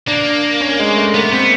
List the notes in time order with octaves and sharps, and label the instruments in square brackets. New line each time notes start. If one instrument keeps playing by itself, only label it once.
[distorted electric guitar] A#3 [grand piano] D4
[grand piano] C#4
G#3
A3
[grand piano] A#3 [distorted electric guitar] B3
[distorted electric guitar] B3 [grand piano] C4